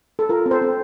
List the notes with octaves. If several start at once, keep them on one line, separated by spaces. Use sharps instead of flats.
A4
F4 A#4
C4
A4 C5
C4